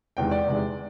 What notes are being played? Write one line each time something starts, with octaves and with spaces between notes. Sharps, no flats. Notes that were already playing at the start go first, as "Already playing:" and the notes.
E2 C3 D#3 G#3 G5
D5
E2 C3 D#3 G#3